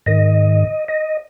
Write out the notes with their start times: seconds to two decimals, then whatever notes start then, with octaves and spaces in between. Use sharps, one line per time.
0.06 G#2 D#3 D#5
0.88 D#5